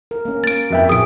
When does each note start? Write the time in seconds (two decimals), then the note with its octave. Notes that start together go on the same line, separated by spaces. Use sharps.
0.11 A#4
0.25 A#3 C#4
0.44 A#3 A6 D7
0.71 F2 B3 F#4 A#4 E5 G5
0.89 A#2 F3 G#4 D#6 D7